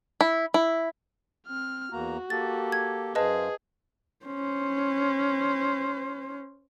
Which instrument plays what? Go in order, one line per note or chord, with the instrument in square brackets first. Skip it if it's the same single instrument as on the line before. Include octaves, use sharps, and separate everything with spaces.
[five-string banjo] E4
E4
[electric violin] C4 F6
[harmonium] E2 A#3 A#5 [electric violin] F#4
[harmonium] A#3 G4 A4 [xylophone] A6
[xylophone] G#6
[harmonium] F#2 C5 F5 [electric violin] G#4 [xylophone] B4 D#5 A5
[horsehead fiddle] C#4 C5